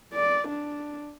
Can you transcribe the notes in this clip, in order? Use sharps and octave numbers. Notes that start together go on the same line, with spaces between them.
D5
D4